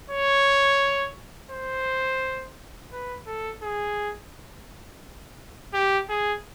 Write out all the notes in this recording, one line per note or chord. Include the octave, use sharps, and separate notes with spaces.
C#5
C5
B4
A4
G#4
G4
G#4